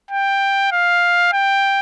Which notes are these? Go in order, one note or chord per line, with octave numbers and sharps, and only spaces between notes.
G5
F5
G5